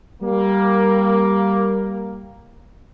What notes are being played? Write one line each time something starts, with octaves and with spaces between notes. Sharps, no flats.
G3 A#3